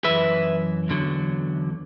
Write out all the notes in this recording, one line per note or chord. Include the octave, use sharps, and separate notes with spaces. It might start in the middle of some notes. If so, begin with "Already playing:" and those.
F#2 E3 B4 E5
E2 D3 F#3